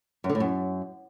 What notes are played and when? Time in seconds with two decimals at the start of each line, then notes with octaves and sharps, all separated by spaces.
0.24 F#2
0.29 D3
0.35 A2
0.40 F#2